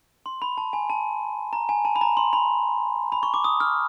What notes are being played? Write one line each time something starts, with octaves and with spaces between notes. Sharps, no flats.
C6
B5
A5
G#5
A5
A#5
G#5
A5
B5
A#5
C6
B5
B5
C#6
D6
D#6
F6